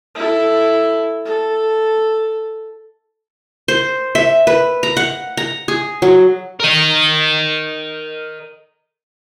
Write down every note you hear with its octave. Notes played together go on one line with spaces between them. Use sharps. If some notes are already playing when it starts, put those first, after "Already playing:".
E4 A4
A4
C5
E5
B4
A#5
F#5
A#5
G#4
F#3
A#4 D#5